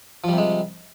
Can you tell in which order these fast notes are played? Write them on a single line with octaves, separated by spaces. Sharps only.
F3 G3 C3 G#3